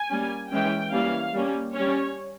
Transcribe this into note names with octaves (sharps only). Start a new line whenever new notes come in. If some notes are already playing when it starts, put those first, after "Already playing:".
Already playing: G#5
G3 A#3 C#4
E3 G#3 C#4 G5
E3 G3 A#3 C#4 F5
G3 A#3 C#4
G3 C#4 C#5